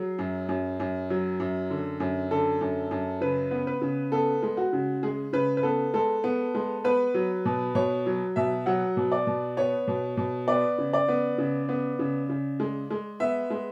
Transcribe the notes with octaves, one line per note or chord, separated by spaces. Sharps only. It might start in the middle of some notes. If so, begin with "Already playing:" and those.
Already playing: F#3 G#4
F#2
F#2
F#2
F#3
F#2
D3
F#2
D3 A4
F#2
F#2
C#3 B4
B3
B4
C#3
B3 A4
G#3
F#4
C#3
G#3 G#4
C#3 B4
B4
B3 A4
G#3 A4
B3
G#3
B3 B4
F#3
B2
B2 C#5
F#3
B2 E5
F#3 F#5
B2
D5
B2
B3 C#5
B2
B2
B3 D5
C#3
D5
B3
C#3
B3
C#3
C#3
G#3
G#3
B3 E5
G#3